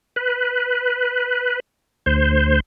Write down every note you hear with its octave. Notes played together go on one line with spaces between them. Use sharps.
B4
D2 C5